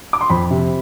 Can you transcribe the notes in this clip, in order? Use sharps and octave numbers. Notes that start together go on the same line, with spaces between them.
D6
C6
F2 B5
C3